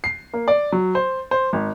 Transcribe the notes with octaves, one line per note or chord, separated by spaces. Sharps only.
C7
A#3
D5
F#3
C5
C5
G#1